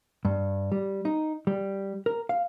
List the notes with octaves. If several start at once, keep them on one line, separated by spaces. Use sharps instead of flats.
G2
G3
D#4
G3
A#4
F5